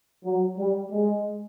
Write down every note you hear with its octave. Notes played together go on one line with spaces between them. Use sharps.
F#3
G3
G#3